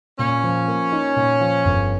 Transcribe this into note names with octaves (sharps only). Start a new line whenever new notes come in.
A#2 C#4
F3
A#3
D#4
A#2
F3
G1